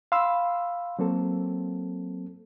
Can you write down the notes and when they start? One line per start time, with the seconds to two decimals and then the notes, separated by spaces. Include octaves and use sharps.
0.12 F5 B5 C6 E6
0.99 F#3 A#3 C4 A4